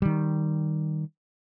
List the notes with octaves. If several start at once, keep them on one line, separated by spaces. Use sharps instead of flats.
D#3 G3